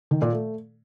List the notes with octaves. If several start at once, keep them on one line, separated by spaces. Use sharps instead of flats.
D#3
A#2
A3